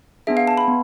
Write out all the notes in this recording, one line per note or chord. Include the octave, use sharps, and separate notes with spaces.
B3 D4 G#4 E5
F5
A5
B5
B3